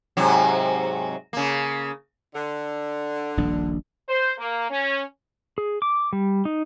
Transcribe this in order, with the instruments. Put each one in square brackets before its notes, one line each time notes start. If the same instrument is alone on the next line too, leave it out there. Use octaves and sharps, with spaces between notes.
[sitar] G#2 C3 F#3
C#3 A#3
[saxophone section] D3
[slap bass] D#1 A#1 D4
[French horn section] C5
A#3
C#4
[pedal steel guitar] G#4
D6
G3
D#4